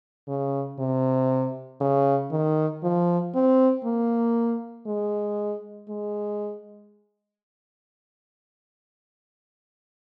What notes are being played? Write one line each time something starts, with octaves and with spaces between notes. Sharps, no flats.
C#3
C3
C#3
D#3
F3
C4
A#3
G#3
G#3